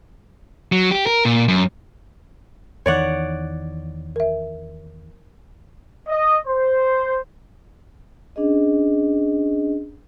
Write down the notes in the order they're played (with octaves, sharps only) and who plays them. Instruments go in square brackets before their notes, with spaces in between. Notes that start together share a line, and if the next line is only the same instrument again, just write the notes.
[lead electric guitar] F#3
G4
A#4
A#2
F#2
[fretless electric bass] E2 D#3 [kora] C#5 D5 F#5
[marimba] A#4 E5
[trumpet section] D#5
C5
[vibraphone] C#4 D4 G#4 D#5